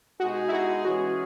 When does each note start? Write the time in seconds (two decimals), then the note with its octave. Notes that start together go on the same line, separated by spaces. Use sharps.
0.20 B2 G#3 D#4 F#4 G#4
0.48 E4
0.53 F#4
0.85 E3 G#3 C#4 F#4 G#4